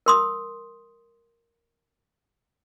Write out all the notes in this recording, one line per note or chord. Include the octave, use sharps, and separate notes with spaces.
A#4 C6 D#6